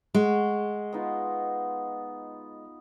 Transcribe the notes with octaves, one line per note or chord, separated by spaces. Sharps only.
G#3 F#5 C#6
B3 D#4 F4